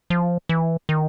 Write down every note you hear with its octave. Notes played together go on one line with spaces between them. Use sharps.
F3
E3
D#3